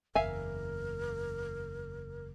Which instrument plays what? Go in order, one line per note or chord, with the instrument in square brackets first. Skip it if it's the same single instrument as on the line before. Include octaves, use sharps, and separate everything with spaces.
[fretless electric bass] F#1 E2 [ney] A#4 [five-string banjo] E5 F5 G#5